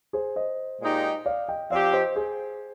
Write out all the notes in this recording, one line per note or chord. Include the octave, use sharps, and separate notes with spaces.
G#4 C5
C5 D#5
A#2 G#3 D#4 G4
D5 F5
D#5 G5
F3 C4 G4 D5 F5
C5 D#5
G#4 C5